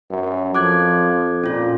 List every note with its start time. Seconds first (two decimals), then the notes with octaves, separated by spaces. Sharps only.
0.10 F#2
0.55 F2 F3 D6 F#6 G#6
1.44 A#2 C#4 F4